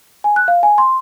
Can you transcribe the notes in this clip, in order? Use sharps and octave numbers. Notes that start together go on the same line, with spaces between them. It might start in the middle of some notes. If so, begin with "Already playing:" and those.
G#5
F#6
F5
G#5
C6